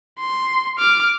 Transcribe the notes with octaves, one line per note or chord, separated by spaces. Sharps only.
C6
D6 F6